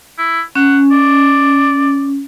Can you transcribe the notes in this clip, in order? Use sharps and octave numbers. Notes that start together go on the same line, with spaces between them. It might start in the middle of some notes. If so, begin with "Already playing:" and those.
E4
C#4 F#5
D5